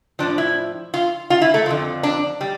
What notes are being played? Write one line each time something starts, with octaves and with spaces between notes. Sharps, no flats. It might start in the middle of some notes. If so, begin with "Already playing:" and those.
A2 F3 D4
E4
F4
F4
E4
A3
F2 D3 F3
D4
G3